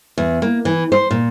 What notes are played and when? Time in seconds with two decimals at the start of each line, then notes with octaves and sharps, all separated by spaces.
0.18 E2
0.42 A#3
0.65 E3
0.92 C5
1.11 A#2